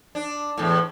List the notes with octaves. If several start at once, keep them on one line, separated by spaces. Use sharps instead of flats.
D4
E2 A2